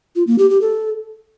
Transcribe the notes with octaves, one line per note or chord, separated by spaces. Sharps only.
F4
A#3
G4
G4
A4